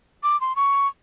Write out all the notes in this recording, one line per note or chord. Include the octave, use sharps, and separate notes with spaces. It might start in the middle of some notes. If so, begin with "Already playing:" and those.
D6
C6
C#6